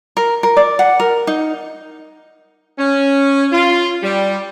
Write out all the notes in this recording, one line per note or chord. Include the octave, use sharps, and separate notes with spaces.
A#4
A#4
D5
F#5
A#4
D#4
C#4
F4
G3